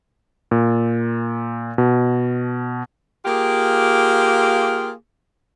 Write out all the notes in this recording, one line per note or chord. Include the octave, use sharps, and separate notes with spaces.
A#2
B2
A#3 F4 G4 G#4